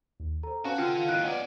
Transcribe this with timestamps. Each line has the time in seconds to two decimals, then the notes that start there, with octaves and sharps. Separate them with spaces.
0.20 D#2
0.43 A4 C5 A#5
0.65 C#4 F#4 B4 F5 G#5 A5
0.78 F4 A4 F#5 G5
1.09 D#2 D#3 E4 F#6
1.24 C#4 B4 D5 D#5 F#5